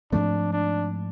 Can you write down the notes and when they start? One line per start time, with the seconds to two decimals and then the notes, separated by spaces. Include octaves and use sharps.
0.12 G#2 F3 A3 C4 D4
0.53 D4